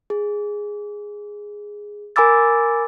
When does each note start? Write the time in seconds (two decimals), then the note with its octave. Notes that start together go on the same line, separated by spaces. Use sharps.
0.10 G#4
2.16 A#4 G#5 B5 D6 E6 A6